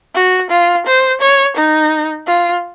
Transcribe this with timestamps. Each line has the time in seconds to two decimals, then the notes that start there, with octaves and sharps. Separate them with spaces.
0.15 F#4
0.50 F4
0.87 C5
1.21 C#5
1.57 D#4
2.27 F4